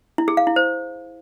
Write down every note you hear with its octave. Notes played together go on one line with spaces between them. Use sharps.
E4
G#4
F5
E4
C5